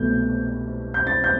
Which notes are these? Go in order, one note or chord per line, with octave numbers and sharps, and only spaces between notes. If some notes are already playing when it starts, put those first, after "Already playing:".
Already playing: C2 B2 A3 G6
G6
A6
G6